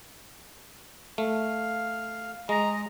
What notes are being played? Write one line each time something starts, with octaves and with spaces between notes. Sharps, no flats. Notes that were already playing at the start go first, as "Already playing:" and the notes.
A3 F5
G#3 D#5 A#5